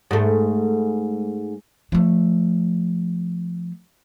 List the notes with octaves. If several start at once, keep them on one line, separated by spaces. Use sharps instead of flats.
G#2 A3
F3 A3